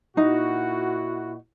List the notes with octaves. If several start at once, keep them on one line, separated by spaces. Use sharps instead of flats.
A#2 D#4 E4 F#4